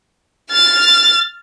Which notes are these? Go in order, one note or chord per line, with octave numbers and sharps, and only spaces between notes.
F6 A6